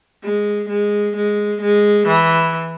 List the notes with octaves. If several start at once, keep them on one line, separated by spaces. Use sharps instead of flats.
G#3
G#3
G#3
G#3
E3